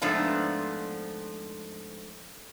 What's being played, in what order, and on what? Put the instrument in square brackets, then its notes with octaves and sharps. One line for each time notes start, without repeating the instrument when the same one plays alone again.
[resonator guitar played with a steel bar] G#2 F3 A3 B3 D4